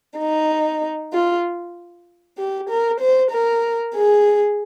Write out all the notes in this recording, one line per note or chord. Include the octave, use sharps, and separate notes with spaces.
D#4
F4
G4
A#4
C5
A#4
G#4